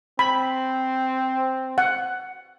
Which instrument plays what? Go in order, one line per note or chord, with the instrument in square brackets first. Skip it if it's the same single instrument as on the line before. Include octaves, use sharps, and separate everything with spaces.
[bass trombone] C4 [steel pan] B5
[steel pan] F#5